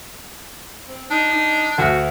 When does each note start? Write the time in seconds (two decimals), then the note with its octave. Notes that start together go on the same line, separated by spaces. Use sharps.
0.87 C4
1.11 D4 D#4
1.33 D#4
1.78 D2 F#4